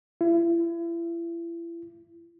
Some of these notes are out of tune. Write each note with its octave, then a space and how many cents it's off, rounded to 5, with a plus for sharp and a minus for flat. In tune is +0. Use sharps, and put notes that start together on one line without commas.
E4 +35